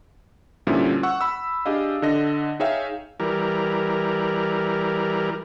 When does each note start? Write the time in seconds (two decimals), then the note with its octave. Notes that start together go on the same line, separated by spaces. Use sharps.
0.67 A#2 D3 F3 G3 C#4 E4
1.03 F#5 C#6 E6
1.21 B5 E6
1.66 D4 G4 G#4 D#5 F5
2.02 D3 D4 D#5 A#6
2.60 D#4 G#4 C#5 E5 F5 G5
3.20 E3 G3 A#4